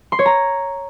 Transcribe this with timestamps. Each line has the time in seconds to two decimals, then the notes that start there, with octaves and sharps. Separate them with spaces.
0.12 C6
0.19 C#5
0.26 A#5